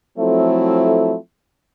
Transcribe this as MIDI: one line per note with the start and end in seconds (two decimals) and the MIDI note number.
0.18 1.15 53
0.18 1.15 54
0.18 1.15 57
0.18 1.15 60
0.18 1.15 64
0.18 1.15 69